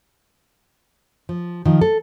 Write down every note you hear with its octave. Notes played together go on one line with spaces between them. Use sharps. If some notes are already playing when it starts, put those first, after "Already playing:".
F3
D#3 F3
A4